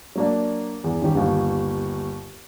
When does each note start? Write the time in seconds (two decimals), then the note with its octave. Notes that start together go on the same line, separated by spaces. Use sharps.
0.15 F#3 A#3 D4
0.84 E2
1.02 D#3 G3 C#4 G4
1.15 G1 D#2